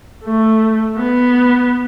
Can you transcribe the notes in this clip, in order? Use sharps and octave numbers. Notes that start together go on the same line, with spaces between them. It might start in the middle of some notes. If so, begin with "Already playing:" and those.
A3
B3